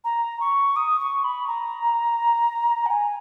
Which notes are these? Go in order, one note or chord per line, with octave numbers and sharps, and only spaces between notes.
A#5
C#6
D#6
C#6
B5
A#5
F#5
G#5